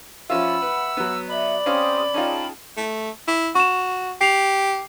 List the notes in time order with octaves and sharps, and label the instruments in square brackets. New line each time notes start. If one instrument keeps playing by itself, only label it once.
[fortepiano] F3 C#4 F4 [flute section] E5 F#5 B5 [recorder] E6
[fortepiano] B4
F#3 B3
[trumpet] D5 [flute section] E5 [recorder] B5
[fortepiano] C4 C#4 F5 [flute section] G4 C6 D#6
[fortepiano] C#4 D#4 F4 [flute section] G#4 G5 A5
[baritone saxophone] A3
E4
[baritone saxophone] F#4 [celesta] C#6 E7
[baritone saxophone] G4 [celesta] C7 F7